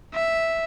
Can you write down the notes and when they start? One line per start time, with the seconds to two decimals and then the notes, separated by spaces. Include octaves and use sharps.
0.14 E5